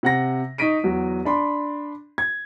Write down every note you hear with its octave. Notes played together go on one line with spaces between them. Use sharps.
C3 F#5 A#6
D#4 C#6 B6 D7 D#7
E2 F#3
D4 B5 C6
G#6